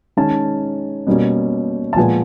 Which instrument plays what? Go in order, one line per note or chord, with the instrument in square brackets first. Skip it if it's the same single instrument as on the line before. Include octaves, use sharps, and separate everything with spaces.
[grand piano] D#3 G#3 C#4 A5
B2 G3 A#3 C#4
A5
A#2 F3 G#3 B3 G#5